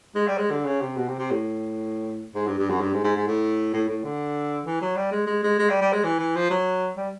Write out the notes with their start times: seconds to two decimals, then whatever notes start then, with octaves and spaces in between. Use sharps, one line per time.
0.15 G#3
0.28 G3
0.38 G#3
0.51 D3
0.65 C#3
0.81 C3
0.96 B2
1.08 C3
1.19 C3
1.31 A2
2.35 G#2
2.47 G2
2.58 G2
2.70 F#2
2.81 G2
2.93 G#2
3.04 G#2
3.16 G#2
3.27 A2
3.73 A2
3.89 A2
4.04 D3
4.66 E3
4.82 F#3
4.97 G3
5.11 G#3
5.27 G#3
5.43 G#3
5.59 G#3
5.70 G3
5.81 G3
5.93 G#3
6.04 E3
6.19 E3
6.36 F3
6.50 F#3
6.97 G3